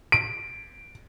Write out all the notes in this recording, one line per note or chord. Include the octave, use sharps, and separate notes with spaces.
D7